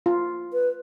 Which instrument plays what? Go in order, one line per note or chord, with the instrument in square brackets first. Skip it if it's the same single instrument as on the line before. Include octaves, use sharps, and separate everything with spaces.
[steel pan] F4
[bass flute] B4